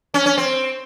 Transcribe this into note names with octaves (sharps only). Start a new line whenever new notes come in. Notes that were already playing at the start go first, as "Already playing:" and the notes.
C#4
C#4
C4